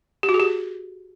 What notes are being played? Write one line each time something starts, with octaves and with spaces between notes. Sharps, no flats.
G4
F#4
G#4
G4